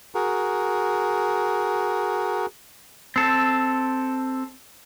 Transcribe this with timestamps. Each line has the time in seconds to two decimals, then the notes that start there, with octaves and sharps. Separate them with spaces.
0.15 F#4 G#4 A#4
3.16 C4 A4